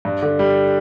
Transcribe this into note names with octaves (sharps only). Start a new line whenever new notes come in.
G2
D3
G3